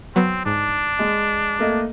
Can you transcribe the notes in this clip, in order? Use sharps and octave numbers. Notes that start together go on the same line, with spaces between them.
F#3 B3 C4
G#2 D4
G#3
A3 A#3 D#5